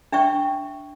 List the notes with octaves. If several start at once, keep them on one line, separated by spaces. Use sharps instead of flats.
D4 E5 G5 C#6